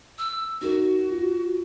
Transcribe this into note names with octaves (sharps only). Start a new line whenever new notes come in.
E6
D#4 F#4 A#4
F4